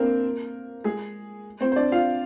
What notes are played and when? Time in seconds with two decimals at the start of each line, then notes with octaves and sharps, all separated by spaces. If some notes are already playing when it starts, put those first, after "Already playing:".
Already playing: A#3 C4 D4 A#4 C5
0.84 G#3 G#4
1.61 C4 C5
1.72 C5
1.76 D4 D5
1.92 F4 F5